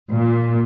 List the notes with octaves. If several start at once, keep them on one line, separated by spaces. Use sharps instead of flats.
A#2